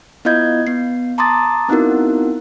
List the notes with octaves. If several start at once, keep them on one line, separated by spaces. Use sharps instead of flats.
B3 E4 F4 D#5 G6 G#6
B3 C7
A5 A#5 C6 D6 D#6 A6
B3 C4 D#4 E4 F#4 A#4